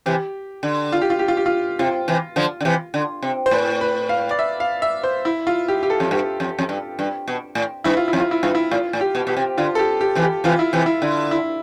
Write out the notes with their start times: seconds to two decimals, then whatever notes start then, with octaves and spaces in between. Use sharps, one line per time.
0.06 C3 E3 G4
0.63 D3
0.92 F4
1.01 G4
1.10 F4
1.19 G4
1.28 F4
1.37 G4
1.46 F4
1.79 C3 F4
2.08 C3 E3
2.36 D3 F3
2.61 D3
2.65 C3 E3
2.94 D3
3.22 C3
3.46 C5
3.51 A2 B4
3.81 B4
4.09 F5
4.31 D5
4.39 E5
4.60 F5
4.82 E5
5.04 C5
5.25 E4
5.47 F4
5.68 G4
5.83 G4
5.90 A4
6.00 F2
6.11 G2 G4
6.40 F2
6.59 F2
6.69 G2
6.99 G2
7.28 B2
7.55 A2
7.84 G2 E4
7.97 F4
8.08 E4
8.13 F2
8.20 F4
8.31 E4
8.43 G2 F4
8.55 E4
8.71 A2 F4
8.93 A2
9.01 G4
9.15 B2
9.27 B2 G4
9.37 C3
9.58 D3 F4
9.75 A4
9.79 G4
10.01 G4
10.15 C3 E3
10.23 G4
10.44 C3 E3 F4
10.59 E4
10.73 C3 E3
10.86 E4
11.02 D3
11.31 E4